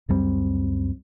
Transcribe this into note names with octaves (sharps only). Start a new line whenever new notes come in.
C#2 F#2 G3 C4